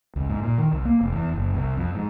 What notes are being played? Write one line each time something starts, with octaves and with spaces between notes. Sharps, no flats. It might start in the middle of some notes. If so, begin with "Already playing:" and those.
C#2
G#2
A#2
D#3
C2
A#3
F1
E2
F#1
C2
F2
G#2